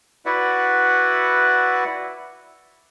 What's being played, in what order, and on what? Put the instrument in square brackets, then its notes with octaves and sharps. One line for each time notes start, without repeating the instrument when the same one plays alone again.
[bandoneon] E4 F#4 B4 D5 E5 F#5